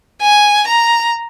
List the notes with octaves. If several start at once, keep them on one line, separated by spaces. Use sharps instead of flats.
G#5
A#5